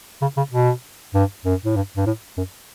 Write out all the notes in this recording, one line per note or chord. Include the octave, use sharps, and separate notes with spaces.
C#3
C#3
B2
G2
F#2
A2
G2
G2
A2
F#2